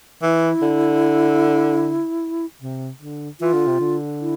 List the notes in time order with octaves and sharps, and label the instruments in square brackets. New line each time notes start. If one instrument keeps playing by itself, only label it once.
[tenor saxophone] E3 [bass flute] E4
[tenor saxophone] D3
C3
D3
[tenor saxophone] E3 [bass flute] F4
[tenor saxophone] D3
C3
D3
[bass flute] E4